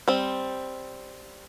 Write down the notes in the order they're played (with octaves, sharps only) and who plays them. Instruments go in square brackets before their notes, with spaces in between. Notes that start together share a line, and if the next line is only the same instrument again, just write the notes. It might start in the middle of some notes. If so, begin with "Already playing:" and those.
[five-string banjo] G3 C4